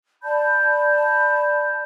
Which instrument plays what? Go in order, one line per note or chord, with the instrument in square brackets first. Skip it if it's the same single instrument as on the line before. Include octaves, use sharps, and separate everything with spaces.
[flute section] D5 A5 B5 G6